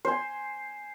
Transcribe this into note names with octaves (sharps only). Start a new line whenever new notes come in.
C5 G#5